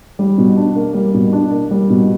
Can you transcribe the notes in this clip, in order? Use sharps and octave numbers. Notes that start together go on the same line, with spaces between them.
G3
B2
D4
A#3
G3
B2
D4
A#3
G3
B2